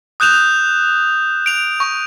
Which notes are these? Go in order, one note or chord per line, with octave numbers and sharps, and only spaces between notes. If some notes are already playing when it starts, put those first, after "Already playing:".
D#6 F#6 G6 E7 F7
D7 F7
C#6